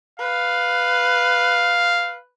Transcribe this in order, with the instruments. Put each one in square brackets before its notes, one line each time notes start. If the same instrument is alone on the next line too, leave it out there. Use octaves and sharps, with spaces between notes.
[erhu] B4 [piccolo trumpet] F5